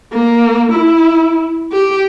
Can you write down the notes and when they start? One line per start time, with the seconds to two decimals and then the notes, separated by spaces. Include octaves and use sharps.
0.12 A#3
0.71 E4
1.72 G4